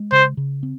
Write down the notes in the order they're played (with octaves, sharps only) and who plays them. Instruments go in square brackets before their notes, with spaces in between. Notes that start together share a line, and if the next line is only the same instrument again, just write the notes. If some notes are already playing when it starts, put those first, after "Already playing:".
Already playing: [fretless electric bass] G#3
[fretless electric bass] C#3 [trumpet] C5
[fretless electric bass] C#3
C4